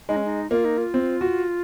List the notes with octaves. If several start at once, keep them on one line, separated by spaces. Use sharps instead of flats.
G#3 D#4
C#4
D#4
A#3 F4
D#4
F4
C4
F#4